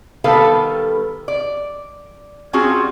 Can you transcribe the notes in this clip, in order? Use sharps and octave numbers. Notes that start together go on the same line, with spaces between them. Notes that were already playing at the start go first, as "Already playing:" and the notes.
D#3 G3 B3 A4 B4 F5
D5
G3 C4 C#4 F4 F#4 G#4